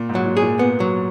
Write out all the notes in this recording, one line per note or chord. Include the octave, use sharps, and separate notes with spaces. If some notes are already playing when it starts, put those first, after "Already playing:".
Already playing: A#2
G#2
F#3
A#2
G#4
A#2
B3
F#3